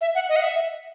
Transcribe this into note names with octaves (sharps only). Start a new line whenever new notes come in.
E5
F#5
D#5
F#5
E5